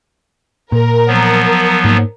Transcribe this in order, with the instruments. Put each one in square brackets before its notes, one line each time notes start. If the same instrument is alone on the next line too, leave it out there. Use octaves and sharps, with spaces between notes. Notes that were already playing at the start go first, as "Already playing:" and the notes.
[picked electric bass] A#2 [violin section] A#4
[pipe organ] F3 F#3 B3
[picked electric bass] G#2 A#3